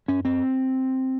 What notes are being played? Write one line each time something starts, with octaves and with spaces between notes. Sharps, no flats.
F#2 C#4
C4